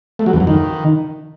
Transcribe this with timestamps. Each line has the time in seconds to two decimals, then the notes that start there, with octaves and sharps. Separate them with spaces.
0.19 A3
0.26 F#3
0.33 E2
0.40 F#2
0.47 D#3